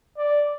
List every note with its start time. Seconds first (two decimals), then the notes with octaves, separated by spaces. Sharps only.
0.18 D5